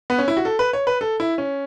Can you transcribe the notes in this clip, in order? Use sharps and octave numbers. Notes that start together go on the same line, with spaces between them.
B3
C#4
E4
F#4
A4
B4
C#5
B4
A4
E4
C#4